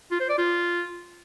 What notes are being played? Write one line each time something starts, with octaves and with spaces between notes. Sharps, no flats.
F4
C5
D5
F4